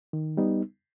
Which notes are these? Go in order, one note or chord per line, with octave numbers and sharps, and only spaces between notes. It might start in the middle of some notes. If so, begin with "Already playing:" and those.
D#3
G3 B3 D#4